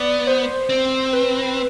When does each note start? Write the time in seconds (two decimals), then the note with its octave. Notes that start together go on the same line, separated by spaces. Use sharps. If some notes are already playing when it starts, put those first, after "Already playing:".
Already playing: B3 D5
0.27 C5
0.69 C4
1.13 B4